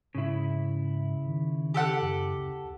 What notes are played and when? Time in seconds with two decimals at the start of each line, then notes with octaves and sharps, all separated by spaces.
0.15 G#2 C#3 E4
1.27 D#3
1.74 G4 A4 F#5
2.01 F#2
2.38 D2